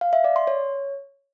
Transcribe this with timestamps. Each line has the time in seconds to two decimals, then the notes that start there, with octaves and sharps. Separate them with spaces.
0.01 F5
0.13 E5
0.24 D5
0.36 C6
0.47 C#5